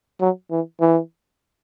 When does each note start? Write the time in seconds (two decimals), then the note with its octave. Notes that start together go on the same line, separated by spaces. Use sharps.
0.21 F#3
0.51 E3
0.81 E3